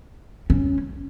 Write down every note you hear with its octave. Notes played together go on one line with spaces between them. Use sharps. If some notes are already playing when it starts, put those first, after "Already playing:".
C#4